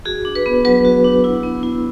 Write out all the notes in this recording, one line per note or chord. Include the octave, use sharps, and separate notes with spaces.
F#4 G#4
D4
B4
B3
F#3 B4
F#4
D4
E4
B3
E4